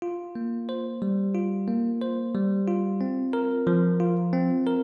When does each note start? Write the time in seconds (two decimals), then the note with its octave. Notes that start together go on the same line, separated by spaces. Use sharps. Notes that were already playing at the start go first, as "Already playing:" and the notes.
0.02 F4
0.35 A#3
0.69 C5
1.02 G3
1.34 F4
1.68 A#3
2.02 C5
2.35 G3
2.68 F4
3.01 C4
3.33 A#4
3.67 F3
4.00 F4
4.33 C4
4.67 A#4